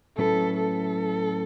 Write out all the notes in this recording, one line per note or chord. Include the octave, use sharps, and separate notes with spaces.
A2 F#3 C#4 E4 A4 B4
A4